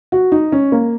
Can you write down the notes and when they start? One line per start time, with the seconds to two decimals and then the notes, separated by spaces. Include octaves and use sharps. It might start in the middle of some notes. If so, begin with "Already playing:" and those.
0.12 F#4
0.32 D#4
0.52 C#4
0.72 A#3